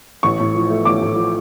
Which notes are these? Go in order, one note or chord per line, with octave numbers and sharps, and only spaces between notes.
A1 C#6
A2
F3
A3
A1 D6
A2
F3